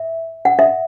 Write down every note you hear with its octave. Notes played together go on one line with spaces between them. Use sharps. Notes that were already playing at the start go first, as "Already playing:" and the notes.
Already playing: E5
F#5
E5